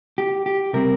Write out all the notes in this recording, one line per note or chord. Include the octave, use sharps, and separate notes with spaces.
G4
G4
C3 G3 C4 A#4